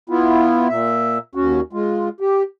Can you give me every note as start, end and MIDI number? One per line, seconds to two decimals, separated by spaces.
0.09 0.68 59
0.09 0.68 64
0.09 0.68 65
0.69 1.18 46
0.69 1.18 76
1.35 1.61 39
1.35 1.61 61
1.35 1.61 66
1.73 2.09 56
1.73 2.09 65
2.20 2.43 67